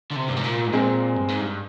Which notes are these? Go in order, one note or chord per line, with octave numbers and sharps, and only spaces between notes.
D3
C3
G2
G#2
A#2
G#2
A#2 G#3 C4
G2
G#2
G2